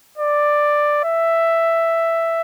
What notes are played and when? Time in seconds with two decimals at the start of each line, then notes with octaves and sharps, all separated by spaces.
0.18 D5
1.04 E5